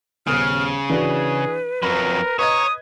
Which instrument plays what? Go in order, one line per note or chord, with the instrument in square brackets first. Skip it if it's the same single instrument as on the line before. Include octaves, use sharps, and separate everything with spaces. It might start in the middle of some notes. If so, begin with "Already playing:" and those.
[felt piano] D#1 B3 D#6 [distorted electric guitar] C#3 [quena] F6
[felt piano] E3 D4 F#4 [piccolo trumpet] G#4 [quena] B4
[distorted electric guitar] F2 F#3 [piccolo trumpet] A#4 [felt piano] B5
[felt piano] B4 D#5 G#6 [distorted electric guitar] C#5 [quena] A#5 [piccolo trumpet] D#6